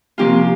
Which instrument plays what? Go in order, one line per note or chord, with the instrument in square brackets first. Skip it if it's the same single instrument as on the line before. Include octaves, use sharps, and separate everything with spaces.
[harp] C3 F3 A#3 C#4 F4 G4